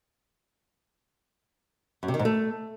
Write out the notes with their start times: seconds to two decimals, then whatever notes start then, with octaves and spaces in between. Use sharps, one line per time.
2.03 F#2
2.08 C3
2.14 D#3
2.19 G#2
2.25 A3